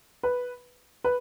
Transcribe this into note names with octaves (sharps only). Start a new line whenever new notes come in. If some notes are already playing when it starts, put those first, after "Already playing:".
B4
B4